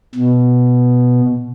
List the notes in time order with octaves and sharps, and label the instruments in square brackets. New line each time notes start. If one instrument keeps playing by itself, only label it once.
[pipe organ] B2